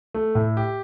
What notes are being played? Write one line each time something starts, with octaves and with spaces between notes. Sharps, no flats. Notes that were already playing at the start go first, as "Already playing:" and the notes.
A3
A2
G4